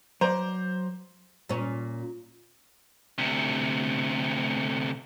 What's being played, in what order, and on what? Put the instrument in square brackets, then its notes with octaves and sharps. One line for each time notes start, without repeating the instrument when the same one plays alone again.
[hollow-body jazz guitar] F#3 B4 D5 [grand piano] C5 A#5
[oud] A#2 C#4
[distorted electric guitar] D2 C3